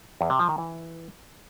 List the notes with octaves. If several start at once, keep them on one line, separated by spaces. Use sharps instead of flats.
E2
C3
F3
D#3
E3